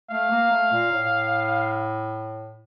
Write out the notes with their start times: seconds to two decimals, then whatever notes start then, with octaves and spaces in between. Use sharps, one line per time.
0.10 A3 F5
0.31 A#3
0.51 A3
0.72 A#2
0.92 A2